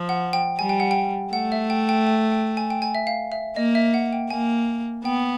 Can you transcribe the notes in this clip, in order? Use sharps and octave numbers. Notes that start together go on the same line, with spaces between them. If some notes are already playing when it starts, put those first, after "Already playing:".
Already playing: F3
F#5
G5
G3 G#5
G5
F#5
G5
A3 F#5
E5
G5
G5
G5
G5
G#5
G5
G#5
E5
F5
E5
A#3 D#5
E5
F#5
G5
A#3 G#5
B3 G5